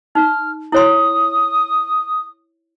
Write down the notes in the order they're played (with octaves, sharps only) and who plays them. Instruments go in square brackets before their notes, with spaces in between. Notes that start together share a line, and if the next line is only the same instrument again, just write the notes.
[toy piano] D#4 [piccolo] F6
[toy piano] E4 C#5 C6 [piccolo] D#6